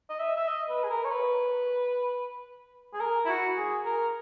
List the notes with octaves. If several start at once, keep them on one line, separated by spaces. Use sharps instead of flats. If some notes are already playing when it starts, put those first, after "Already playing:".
D#5
E5
E5
D#5
B4
G#4
A#4
C#5
B4
G#4
A#4
E4
F#4
G#4
A#4